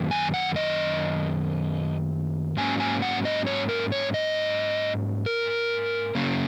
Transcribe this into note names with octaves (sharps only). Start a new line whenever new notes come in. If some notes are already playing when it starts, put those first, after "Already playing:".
Already playing: F#2 D#3 F#3 A#3 C#4
G#5
F#5
D#5
G#2 F#3 A#3 C#4 G#5
G#5
F#5
D#5
C#5
A#4
C#5
D#5
A#4
C#3 F#3 A#3 C#4